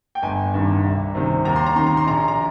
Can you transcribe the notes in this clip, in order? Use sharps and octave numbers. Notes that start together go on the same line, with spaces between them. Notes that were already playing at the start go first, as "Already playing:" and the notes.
G5
G1 G#5
G2 D#3
C2
C3 D#3
D#2 A#5
C6
A#5
D#3 C6
A#5
C6
A#1 A#5
C6
A#5